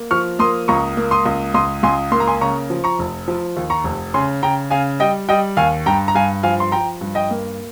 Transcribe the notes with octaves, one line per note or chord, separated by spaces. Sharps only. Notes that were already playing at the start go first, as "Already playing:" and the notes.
Already playing: A#3
F3 C#6 F6
A#3 C6 D#6
C#2 A#5 C#6
A#3
C6 D#6
C#2
C#2 C6 D#6
C#2 G#5 C6
A#3 C6
A#5
G#5 C6
C#3 A#5 C#6
F3
A#5 C#6
F1
F3
D#2
A#5 C#6
F1
C#3 G#5 C6
C#3 G5 A#5
C#3 F5 G#5
G3 D#5 G5
G3 D#5 G5
D#2 F5 G#5
G2 G5 A#5
A#5
G2 F5 G#5
F3 F5 G#5
C6
F3 G5 A#5
G2
D#5 G5
A#3